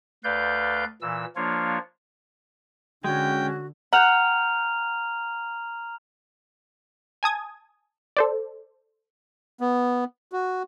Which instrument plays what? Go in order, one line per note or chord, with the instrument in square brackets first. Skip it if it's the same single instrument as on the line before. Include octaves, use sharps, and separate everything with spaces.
[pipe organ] D2 B4 D5 F5 G6
A#2 E3 E6
F3 A#3 D4 F4 C#5
[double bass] D3 [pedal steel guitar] G#3 C#4 [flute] F#4 [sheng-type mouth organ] G5
[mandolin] F#5 G5 [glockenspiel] A#5 F6 F7
[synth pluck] G#5 A5 D#6 G#6
A4 C5 D5
[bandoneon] B3
F#4